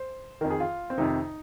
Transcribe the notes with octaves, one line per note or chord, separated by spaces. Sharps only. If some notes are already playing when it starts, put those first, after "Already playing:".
Already playing: C5
F2 D#3 A#4
G#4
F4
C4
F2 C3 D#3 D#4